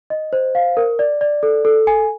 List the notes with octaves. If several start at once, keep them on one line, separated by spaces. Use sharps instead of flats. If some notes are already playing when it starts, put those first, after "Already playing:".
D#5
C5
F5
A#4
D5
D5
A4
A4
G#5